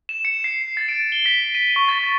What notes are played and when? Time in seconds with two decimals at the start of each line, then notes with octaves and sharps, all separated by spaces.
0.09 E7
0.25 C#7
0.44 C7
0.77 A6
0.88 D7
1.12 G7
1.26 B6
1.55 D#7
1.76 C#6
1.89 A6